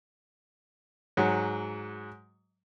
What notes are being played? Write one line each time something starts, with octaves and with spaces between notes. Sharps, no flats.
G#2 F#3